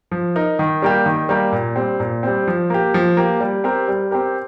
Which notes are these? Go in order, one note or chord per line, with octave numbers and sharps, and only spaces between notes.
F3
D#4 A#4
D#3
G3 A#3 G4
D#3
G3 A#3 G4
A#2
G3 C4
A#2
G3 C4
F3
A#3 G4
F3
A#3 G4
G3
C4 G4 A#4
G3
C4 G4 A#4